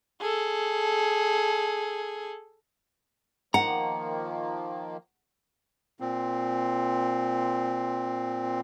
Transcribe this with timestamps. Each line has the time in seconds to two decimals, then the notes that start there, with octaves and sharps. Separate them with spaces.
0.21 G#4 A4
3.54 D#3 F3 A#3 F#5 A#5
6.00 A#2 C4